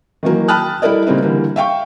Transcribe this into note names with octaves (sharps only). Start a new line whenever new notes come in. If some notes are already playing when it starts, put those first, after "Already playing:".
D#3 E3 F#3 A#3
G5 A5 B5 D#6 F6 F#6
G3 E4 A4 A#4 D5 D#5
C#3 G3 A#3 C4 D#4
D3 E3 G3 A#3
E5 F5 G5 C#6